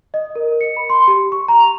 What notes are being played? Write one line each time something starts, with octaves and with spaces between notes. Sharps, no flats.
D#5
A#4
C#7
B5
C6
G4
C#6
A#5
F7